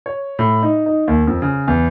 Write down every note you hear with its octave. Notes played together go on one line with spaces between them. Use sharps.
C#5
A2
D#4
D#4
D#2
F2
C#3
E2